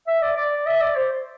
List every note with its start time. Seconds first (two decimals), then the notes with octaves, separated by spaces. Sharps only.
0.07 E5
0.22 D5
0.37 D5
0.67 E5
0.81 D5
0.96 C5